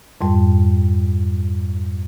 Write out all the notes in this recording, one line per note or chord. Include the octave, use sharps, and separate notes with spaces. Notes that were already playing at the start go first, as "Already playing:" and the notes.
F2 G#2 G3